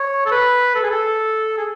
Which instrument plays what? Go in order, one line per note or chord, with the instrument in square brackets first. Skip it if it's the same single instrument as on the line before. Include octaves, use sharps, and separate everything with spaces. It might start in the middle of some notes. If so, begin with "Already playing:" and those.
Already playing: [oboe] C#5
A4
B4
A4
G#4
A4
G#4